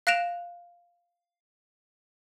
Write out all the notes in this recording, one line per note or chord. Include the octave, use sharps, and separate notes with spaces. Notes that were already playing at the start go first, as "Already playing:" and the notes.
F5 F#6 A#6 D7 E7 F7